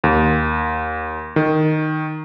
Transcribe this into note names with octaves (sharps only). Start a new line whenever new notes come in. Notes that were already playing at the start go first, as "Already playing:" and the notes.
D#2
D#3